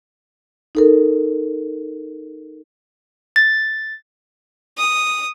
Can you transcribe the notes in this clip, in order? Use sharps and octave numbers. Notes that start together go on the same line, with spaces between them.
D#4 A4 A#4
A6
D#6